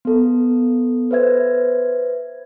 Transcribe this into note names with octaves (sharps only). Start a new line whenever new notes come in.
B3 A4
B4 C5 E5 G#6